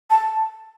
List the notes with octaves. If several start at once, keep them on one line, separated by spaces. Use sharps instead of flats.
A5